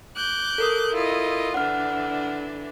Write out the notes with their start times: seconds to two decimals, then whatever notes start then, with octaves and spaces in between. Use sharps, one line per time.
0.16 D6 F#6 G6
0.58 A4 A#4 D#6
0.93 E4 F4 D#5
1.54 D3 E3 D4 F#5 F6